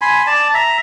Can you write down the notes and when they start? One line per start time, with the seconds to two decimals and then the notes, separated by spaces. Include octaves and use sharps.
0.01 G#5 B5 C6
0.27 D5 A5
0.54 E5 A#5